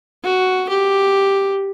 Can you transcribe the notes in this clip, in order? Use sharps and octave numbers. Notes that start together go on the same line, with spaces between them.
F#4
G4